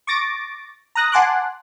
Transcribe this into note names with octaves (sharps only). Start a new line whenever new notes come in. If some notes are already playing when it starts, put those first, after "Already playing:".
C#6 D6 A6 A#6 D7
A#5 D#6 F#6 A#6
F#5 G#5 A5 C6 D6 F#6